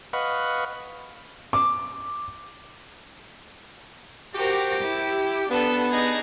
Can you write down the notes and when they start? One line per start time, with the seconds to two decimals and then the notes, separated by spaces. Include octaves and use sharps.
0.13 B4 D#5 F5 F#5 B5 C#6
1.53 D6
4.35 F#4 G4 A#4 C5
4.80 E4
5.50 B3 D4 A4 B4
5.90 D4 D#4 G#4